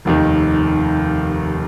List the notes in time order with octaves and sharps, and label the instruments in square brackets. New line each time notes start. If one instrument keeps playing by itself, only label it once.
[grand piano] F1 D#2 D#3